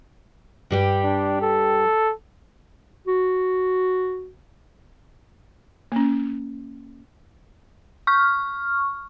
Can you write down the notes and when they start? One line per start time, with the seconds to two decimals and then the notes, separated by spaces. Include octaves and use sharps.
0.70 G2 G3 G4
1.04 D4
1.42 A4
3.07 F#4
5.92 A#3 C#4
8.07 C#6 F6